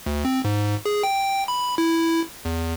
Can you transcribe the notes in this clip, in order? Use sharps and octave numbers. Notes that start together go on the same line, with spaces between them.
D2
C4
G#2
G#4
G5
B5
E4
E2